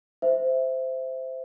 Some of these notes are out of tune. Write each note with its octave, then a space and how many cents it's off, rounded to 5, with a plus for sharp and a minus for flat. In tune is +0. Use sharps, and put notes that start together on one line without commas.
C5 -10 E5 +0